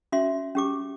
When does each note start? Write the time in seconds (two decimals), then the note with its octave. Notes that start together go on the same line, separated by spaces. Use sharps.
0.12 C#4 F#4 E5 C6
0.55 C#4 G4 D6